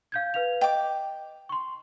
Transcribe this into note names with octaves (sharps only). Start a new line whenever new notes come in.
F5 G6 G#6
B4 F5 F7
D#5 G5 D6
C6 C#6